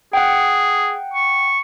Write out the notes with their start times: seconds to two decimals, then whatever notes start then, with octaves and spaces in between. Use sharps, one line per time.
0.13 G#4 F#5 G5
1.14 C#6